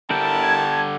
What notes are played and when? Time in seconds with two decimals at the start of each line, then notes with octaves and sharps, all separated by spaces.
0.10 D3 E4 G4 A#4 G5 A5
0.43 G#6